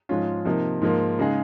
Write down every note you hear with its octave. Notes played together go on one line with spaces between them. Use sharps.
G#2 F3 G#3 C#4 F4
C3 F3 A#3 D#4
G#2 F3 A#3
C#3 G#3 D#4 G#4